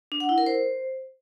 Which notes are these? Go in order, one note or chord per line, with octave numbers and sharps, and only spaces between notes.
D4
F#5
E4
A#4
C5